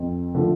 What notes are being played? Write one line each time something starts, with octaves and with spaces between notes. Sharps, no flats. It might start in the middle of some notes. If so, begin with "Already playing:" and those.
Already playing: F2
D3 F3 A3